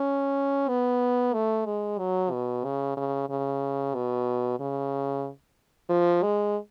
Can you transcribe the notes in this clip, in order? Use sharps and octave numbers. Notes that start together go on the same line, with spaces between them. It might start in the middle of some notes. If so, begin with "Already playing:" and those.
Already playing: C#4
B3
A3
G#3
F#3
B2
C#3
C#3
C#3
B2
C#3
F3
G#3